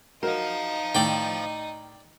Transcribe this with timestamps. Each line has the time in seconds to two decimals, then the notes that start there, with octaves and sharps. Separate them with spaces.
0.23 F#3 D#4 A#4 C5 D#5 F5
0.95 A2 D#3 D5 G5